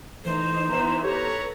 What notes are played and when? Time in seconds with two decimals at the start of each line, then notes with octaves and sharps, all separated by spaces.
0.25 E3 A3 D#4 C5
0.70 E3 B3 D#4 A#5
1.03 G4 A4 B4 C#5 A#5